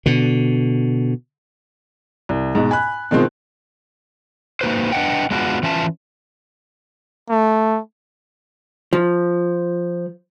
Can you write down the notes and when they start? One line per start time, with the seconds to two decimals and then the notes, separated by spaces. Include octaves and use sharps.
0.06 B2 D3
2.29 C2
2.55 G#2 B2
2.71 G#5 B5 F#6
3.11 B2 D#3 G#3 C4 F4
4.61 A#3 B3 D#4 F#4 B4 C5
4.92 D4 B4 D5 D#5 F#5 G5
5.31 G#3 B3 D4 F4 F#4
5.63 E3 C#4 F4 E5 A5
7.30 A3
8.93 F3